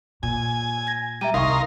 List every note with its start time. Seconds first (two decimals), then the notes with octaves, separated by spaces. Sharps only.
0.23 A#2 G#5
0.87 G#6 A#6
1.21 G3 E5 A#5 D#7
1.34 C2 D#4 A#4 F5 C6 C#6